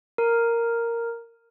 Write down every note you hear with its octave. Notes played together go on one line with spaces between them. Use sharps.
A#4